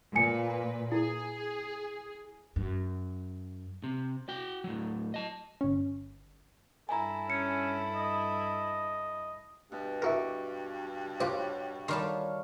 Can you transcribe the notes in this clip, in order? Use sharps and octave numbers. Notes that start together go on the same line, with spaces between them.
A#2 B4 G#5 C#7
E4 G#4
F#2
C3
F#4 G5
A2 F#3
D#5 A5
G1 C#4
G2 E4 A4 G#5 A#5
C#4 C#7
D#5
G2 B2
E4 F#4 A#4 C#6 D6
F4 G4 C5 C#5 F#5 B5
D#3 G3 C#5 F5 A5 C6 C#6